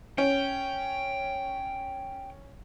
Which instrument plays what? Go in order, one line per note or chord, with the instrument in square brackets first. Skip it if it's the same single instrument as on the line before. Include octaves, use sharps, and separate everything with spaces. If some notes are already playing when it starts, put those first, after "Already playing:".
[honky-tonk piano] C#4 [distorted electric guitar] G5